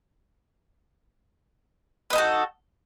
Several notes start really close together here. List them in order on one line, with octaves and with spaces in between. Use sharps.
B4 D#4 A4 F#4